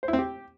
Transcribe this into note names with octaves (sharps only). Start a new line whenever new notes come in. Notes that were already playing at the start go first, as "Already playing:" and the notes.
C5
E4
C4
G4